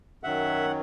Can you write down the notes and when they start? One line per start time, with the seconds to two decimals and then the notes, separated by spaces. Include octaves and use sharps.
0.23 F#2 D#3 F#3 E5 F#5